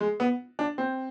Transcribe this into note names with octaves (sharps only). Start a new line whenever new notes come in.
G#3
B3
D4
C4